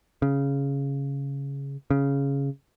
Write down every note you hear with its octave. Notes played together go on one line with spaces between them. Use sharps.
C#3
C#3